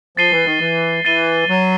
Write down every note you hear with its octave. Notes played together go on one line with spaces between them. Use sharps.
F3 A6 C7 D#7 G7
E3
D#3
E3
E3 A6 C7 D#7 G7
F#3